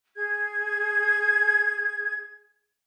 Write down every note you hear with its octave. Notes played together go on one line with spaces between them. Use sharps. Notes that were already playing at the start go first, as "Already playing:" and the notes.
G#4 G#6